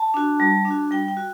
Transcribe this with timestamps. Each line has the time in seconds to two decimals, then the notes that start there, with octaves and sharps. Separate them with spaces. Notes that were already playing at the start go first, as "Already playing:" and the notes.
Already playing: A5
0.14 D4 F#4
0.40 G3
0.65 D4
0.70 F#4
0.91 G3 G5
1.08 G5
1.17 F#4